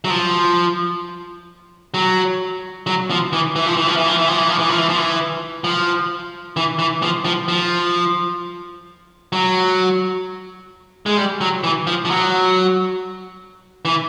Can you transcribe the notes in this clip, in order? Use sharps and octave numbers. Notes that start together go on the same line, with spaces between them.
F#3
F3
F#3
F#3
F3
E3
E3
F3
E3
F3
E3
F3
E3
F3
E3
F3
E3
F3
E3
F3
E3
F3
E3
E3
F3
F3
F3
F#3
G#3
G3
F#3
E3
F3
F3
F#3
E3